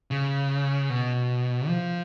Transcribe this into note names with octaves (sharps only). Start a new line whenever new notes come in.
C#3
B2
F3